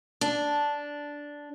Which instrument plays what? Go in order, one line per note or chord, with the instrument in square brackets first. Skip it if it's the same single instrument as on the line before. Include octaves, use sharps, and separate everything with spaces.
[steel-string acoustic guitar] D4